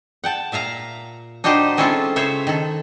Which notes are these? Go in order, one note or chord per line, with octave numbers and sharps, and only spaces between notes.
F#5 G5 A5
A#2 E5 F5 A#5
D4 D#4 F#4 G4 C5 D#5
G#3 C4 C#4 E4 F4 A4
C#3 C5 C#5 E5
D#3 A4